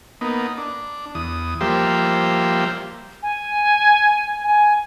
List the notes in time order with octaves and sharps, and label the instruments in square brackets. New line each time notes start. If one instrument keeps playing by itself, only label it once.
[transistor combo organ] A#3 B3 D#4
D4
E2 D#6
F3 G3 A#3 G4 C5 E5
[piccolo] G#5
G#5